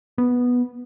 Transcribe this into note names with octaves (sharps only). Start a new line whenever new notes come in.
B3